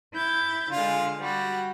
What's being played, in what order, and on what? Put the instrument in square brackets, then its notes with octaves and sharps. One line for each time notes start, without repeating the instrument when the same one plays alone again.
[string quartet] E4 G6 A6
[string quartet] D3 G#3 [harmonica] F4
[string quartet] G3 [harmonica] F#4